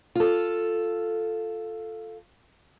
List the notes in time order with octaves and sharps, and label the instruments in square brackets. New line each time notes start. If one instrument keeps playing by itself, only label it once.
[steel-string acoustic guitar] F4 A4